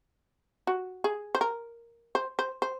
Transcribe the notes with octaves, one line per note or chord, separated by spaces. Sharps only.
F#4
G#4
C5
A#4
C5
C5
C5